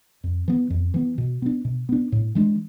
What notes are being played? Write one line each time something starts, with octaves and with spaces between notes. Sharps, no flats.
F2
E3 B3
F2
E3 B3
B2
B3 D4
B2
B3 D4
A2
E3 G#3 D4